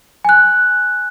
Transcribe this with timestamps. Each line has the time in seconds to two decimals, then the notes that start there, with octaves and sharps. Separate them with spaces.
0.25 G#5 F#6